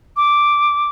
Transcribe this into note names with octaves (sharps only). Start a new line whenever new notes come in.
D6